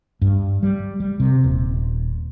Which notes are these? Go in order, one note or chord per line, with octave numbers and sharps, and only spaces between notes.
G2
G3
G3
C3
D#1